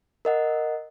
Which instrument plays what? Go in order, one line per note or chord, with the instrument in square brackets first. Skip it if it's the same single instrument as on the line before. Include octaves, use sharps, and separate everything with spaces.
[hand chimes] A#4 D#5 F#5